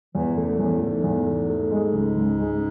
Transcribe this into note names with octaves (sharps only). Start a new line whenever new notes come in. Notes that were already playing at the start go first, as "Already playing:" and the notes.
E2 E3
F#2 A3
E2 A2
G#2 A3
E2
A3
A3
G#3
C#2
C#2
G#3